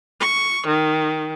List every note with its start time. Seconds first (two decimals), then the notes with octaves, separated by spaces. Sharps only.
0.21 C#6
0.67 D#3